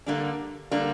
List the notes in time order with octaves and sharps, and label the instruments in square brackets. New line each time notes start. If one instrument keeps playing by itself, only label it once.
[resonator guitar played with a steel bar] D3 G3 A#3 D4
D3 G3 A#3 D4